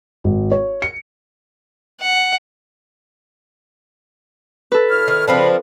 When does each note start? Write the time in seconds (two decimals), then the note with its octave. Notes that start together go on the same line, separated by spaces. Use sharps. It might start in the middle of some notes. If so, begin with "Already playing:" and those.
0.24 G#1
0.51 C#5
0.82 C#7
2.01 F#5
4.72 A4 B4
4.89 A2 C#5 F6
5.08 D#3
5.28 F2 C#3 F3 C4 D4 B5